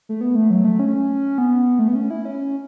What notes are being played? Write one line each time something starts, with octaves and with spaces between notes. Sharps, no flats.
A3
B3
A3
F#3
A3
C#4
B3
A3
B3
C#4
E4
C#4